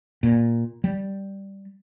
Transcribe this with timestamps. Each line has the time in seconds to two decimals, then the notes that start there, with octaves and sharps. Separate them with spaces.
0.23 A#2
0.84 G3